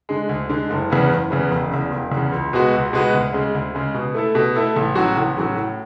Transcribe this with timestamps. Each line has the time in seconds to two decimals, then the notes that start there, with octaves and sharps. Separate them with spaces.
0.09 D3 G#3
0.29 D2
0.50 D3 G#3
0.70 F#1
0.90 E2 C#3 E3 B3
1.10 F#1
1.30 E2 C#3 E3 B3
1.51 E1
1.71 E2 C#3
1.91 E1
2.12 E2 C#3
2.32 C#2
2.53 B2 G#3 B3 F#4
2.73 C#2
2.93 B2 G#3 B3 F#4
3.14 D2
3.33 C#3 G#3
3.54 D2
3.75 C#3 G#3
3.94 B2
4.14 A3 E4 A4
4.35 B2
4.55 A3 E4 A4
4.76 A1
4.95 A2 F#3 C#4 F#4
5.17 A1
5.37 A2 F#3 C#4 F#4
5.57 A2